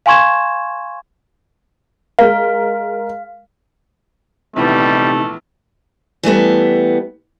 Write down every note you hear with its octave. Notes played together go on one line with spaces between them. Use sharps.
F5 G#5 C6 C#6 G#6 E7
G#3 A#4 F5
A#1 C3 E3 G3 A3 B3 C4 D#4
E3 G3 A3 B3